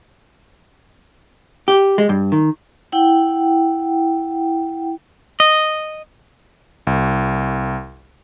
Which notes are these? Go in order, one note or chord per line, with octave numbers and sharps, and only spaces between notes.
G4
G#3
G2
D#3
E4 F#5 G5
D#5
C2